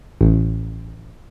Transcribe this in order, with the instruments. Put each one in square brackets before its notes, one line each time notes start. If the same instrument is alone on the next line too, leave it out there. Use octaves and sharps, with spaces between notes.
[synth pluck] A1